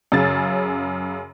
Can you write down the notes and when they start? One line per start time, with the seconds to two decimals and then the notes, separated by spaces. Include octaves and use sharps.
0.12 F#2 C#3 A6